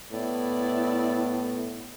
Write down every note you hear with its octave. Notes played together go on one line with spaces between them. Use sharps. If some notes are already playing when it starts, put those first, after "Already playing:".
A2 B3 E4 D5